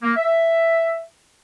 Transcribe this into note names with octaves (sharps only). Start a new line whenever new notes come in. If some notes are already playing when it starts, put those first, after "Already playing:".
A#3
E5